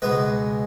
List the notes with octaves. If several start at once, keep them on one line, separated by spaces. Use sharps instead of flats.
C#2 B2 G#3 B3 B4